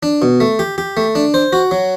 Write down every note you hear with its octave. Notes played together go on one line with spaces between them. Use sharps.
D4
B2
A3
G4
G4
A3
D4
C5
F#4
F#3